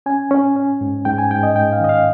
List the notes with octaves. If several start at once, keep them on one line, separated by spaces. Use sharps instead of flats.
C#4 G#5
C#4
C#4
G#2
G#2 G5
G#5
G#2 G5
D#5
G#2 G5
F5
D#3 D#5
F5